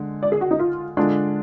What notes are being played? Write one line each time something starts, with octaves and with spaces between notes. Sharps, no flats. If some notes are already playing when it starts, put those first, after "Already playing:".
Already playing: D3 G#3
D5
G#4
F#4
D#4
F4
D3 G#3 D4 F4